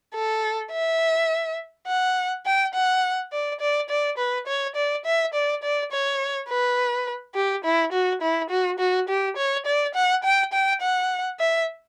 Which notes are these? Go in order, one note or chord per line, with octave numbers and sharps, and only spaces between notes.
A4
E5
F#5
G5
F#5
D5
D5
D5
B4
C#5
D5
E5
D5
D5
C#5
B4
G4
E4
F#4
E4
F#4
F#4
G4
C#5
D5
F#5
G5
G5
F#5
E5